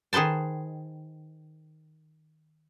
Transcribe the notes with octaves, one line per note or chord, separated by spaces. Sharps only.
D#3 G#4 B4 C5 A5